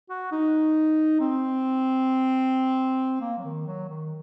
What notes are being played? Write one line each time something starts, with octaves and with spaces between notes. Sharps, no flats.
F#4
D#4
C4
A#3
F#3
D#3
F#3
D#3